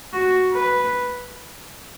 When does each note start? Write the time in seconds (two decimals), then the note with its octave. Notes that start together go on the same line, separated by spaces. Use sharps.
0.13 F#4
0.53 B4